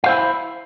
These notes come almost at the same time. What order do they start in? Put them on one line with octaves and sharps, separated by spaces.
F5 C5 E4